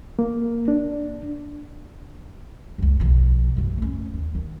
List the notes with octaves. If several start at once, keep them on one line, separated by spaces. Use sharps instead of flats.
A#3
D4
C#2 F#2
B1 F3
C#2 F#2
D2 C#4
D#2
D#3